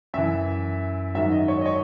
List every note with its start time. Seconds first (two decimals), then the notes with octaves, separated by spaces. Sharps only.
0.14 F#2 E3 E5
1.15 G#2 D#3 F#3 E5
1.31 D#5
1.48 C#5
1.61 D#5
1.66 C#5